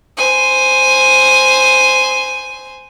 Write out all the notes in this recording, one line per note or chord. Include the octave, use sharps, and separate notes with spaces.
C5 G#5